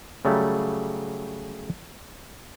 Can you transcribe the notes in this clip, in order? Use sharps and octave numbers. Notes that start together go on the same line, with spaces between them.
C#3 F#3 G3 A3